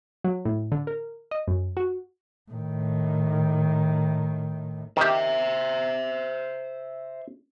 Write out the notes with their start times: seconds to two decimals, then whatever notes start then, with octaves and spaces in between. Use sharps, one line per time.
0.24 F#3
0.45 A2
0.72 D3
0.87 A#4
1.31 D#5
1.48 F#2
1.77 F#4
2.52 A2 D#3
4.97 D#3 G4 C5 E5